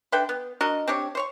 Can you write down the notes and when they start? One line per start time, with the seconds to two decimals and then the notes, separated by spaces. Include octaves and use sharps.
0.12 D3 B4 E5 G5
0.29 B3
0.61 D4 F#4 A#4 D#5
0.88 C4 D4 G4 C#5
1.15 C5 C#5 C#6